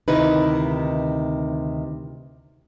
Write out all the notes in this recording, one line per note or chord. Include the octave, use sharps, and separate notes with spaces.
D2 C3 D#3 D#4 E4 B4